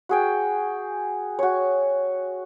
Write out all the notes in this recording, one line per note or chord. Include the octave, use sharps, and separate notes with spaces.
F#4 G#4 G5
F#4 C#5